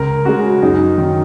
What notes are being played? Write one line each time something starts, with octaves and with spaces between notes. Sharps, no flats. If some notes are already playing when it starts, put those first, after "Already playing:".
Already playing: C#2 A#4
C#3 G#3 F#4
F#2 D#4
D#3 F#3